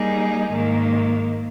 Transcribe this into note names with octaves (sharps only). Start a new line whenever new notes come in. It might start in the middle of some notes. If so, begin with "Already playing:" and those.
Already playing: G3 A#3 D#4 G#4
G#2 D#3 A#3